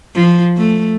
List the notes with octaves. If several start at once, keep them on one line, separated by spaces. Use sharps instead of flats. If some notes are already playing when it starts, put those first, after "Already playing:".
F3
A3